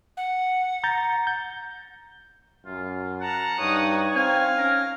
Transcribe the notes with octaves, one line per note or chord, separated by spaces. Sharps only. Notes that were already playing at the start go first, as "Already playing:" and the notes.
F#5
A#5 G6 A6
G6
F#2 F4
F#5 A5 A#5
G2 D#4 C#5 D#6
C4 F5 G#5
C#4 A#4